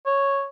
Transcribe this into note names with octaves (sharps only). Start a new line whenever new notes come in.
C#5